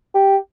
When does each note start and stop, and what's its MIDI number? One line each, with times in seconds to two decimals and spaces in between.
0.14 0.36 67